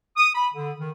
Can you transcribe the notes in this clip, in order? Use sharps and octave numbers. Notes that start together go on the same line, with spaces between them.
D#6
B5
D3
D#3